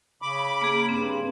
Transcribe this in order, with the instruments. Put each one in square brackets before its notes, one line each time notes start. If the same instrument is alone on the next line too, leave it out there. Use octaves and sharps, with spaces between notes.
[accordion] C#3 B5 D6
[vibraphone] A#3 G#4
[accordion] G2 [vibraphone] C4